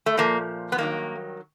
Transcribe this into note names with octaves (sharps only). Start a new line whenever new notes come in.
A3
A#2 F3 A#3
B3
G2 D#3 F#3 A#3